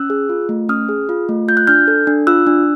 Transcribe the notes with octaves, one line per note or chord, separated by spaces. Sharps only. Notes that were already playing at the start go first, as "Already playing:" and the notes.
Already playing: C#4 E6 F#6
G#4
F4
A3
C#4 D#6 F6
G#4
F4
A3
F4 G6
F#6
D4 F6 G6
A4
D4
F4 E6 F#6
D4